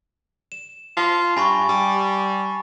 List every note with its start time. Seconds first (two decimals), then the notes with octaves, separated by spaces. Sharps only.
0.52 E7
0.97 F4 A5
1.37 G2 G#5 B5 C#6
1.69 G3